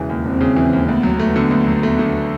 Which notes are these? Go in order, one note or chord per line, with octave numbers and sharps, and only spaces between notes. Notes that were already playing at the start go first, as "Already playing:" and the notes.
Already playing: E1 C#3 E3
D#2
E1 C4
C#3
E3
D#2
D2 B3
F#3
A3 B3
D3
D2
F#3
A3
D3